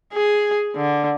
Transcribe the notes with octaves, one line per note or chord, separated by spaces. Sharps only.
G#4
D3